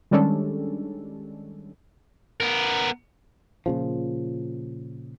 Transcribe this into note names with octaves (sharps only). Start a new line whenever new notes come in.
D#3 G3 G#3 C#4 D4 A4
B3 A#4
A#2 C#3 F3